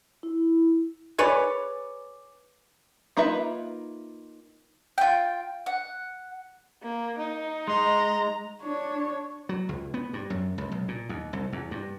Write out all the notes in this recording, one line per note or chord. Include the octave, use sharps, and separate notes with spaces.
E4
G#4 B4 C#5 D5
A#3 D#4 F4 B4 E5
F4 G5
F#5
A#3
D#4
G#3 A#5 C6
D4 C#5
F#3
C#2
B3
G2
F#2
C#2
B1
A#2
D#2
C2
E2
G2